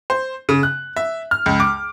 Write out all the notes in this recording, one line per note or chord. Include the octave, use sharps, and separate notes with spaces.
C5
C#3
F#6
E5
F6
C#2
D6